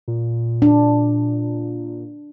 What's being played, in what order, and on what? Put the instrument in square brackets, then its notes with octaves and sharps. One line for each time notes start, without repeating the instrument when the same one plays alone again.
[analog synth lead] A#2
[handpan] D4